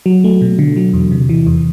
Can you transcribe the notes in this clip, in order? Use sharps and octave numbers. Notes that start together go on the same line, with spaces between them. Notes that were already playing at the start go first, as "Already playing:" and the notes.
F#3
A3
B2
D3
F#3
E2
C3
E3
E2